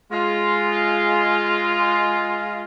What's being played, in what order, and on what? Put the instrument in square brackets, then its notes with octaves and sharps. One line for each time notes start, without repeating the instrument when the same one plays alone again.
[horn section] G#3 F4